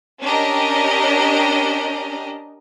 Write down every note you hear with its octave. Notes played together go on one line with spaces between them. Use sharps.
C#4 D4 G4 A#4 D#5